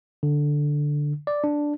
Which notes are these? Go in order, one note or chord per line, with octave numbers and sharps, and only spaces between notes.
D3
D5
D4